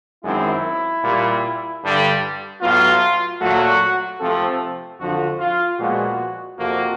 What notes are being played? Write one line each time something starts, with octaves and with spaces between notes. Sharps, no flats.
F#2 D#3 G#3 C4 E4
A#2 G3 A#3
G2 D3 G3
A2 F#3 B3 F4
A#2 F#3 A3 F#4
C3 F3 A3 C4 A4
F2 D3 F3 F#4
F4
A#2 F3 G#3 B3 F#4
F2 C3 F3 A#3 F#4